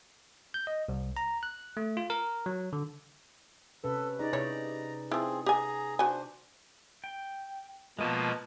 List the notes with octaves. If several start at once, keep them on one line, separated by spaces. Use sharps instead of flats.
G6
D#5
C2
A#5
F#6
A3
F4
A#4
F#3
D3
C3 C#4 A4 B4
D#4 G#4 D5 A#5
C3 E4 C#5
F3 C4 E4 G#4
G4 G#4 G#5 A#5
D4 F#4 C5 G#5
G5
B2 F3 G#3 A#3 D#5 A5